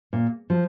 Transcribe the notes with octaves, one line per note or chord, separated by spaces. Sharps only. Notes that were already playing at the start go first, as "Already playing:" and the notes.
A#2
F3